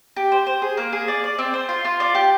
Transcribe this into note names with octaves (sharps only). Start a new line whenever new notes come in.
G4
C5
C5
G#4
A#3
G#4
D5
D5
C4
C5
F4
F4
D5
G4